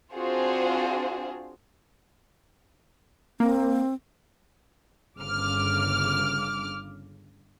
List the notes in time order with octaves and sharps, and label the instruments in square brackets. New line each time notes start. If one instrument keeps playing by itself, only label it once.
[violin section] C4 D4 F4 F#4 G#4 C5
[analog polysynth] A#3 [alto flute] C4
[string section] G1 C#3 D6 F6